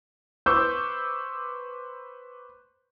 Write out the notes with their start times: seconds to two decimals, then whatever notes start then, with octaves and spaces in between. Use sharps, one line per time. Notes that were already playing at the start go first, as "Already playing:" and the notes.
0.46 B4 C5 C#6 D6 E6 G6